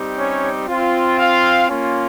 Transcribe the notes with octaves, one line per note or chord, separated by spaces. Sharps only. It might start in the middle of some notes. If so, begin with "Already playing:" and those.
Already playing: G3 C4 D#4 G4
C#4 C#5
C4 F4
F4 F5
A#3 C#4 F4